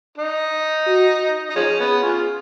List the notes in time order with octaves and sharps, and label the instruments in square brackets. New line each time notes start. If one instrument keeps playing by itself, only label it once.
[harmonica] D#4
[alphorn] F#4
[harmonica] D#4
[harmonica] F3 C#4 [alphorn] G#4
[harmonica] B3
[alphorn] G#4
[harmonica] C#4 F4